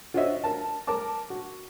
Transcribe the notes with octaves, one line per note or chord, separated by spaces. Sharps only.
F4 F#4 C5 C#5 D#5 E5
A#4 A5
A#4 A5 D6
F#4